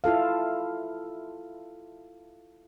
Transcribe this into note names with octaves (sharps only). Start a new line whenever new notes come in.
E4 F4 A4 F5